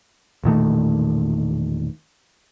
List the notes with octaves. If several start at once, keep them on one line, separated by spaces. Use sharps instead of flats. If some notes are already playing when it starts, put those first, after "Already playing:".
E1 A#2 D#3 A3